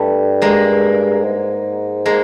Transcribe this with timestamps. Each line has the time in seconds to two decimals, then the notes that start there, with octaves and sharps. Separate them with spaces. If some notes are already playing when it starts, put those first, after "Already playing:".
Already playing: G2 G3 A3
0.42 G#3 A#3
1.24 G#2
2.06 G#3 A#3